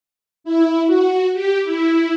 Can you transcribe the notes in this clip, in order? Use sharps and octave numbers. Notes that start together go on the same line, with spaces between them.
E4
F#4
G4
E4